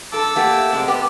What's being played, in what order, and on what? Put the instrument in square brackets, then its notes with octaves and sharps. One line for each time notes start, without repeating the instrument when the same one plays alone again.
[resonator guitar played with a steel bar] G2 A4 [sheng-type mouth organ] A5 D6 E6
[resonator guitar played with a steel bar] A3 A#3 G4 [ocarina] F#5
[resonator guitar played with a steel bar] C3 G#3
[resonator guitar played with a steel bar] B3 [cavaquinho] G4 [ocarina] D6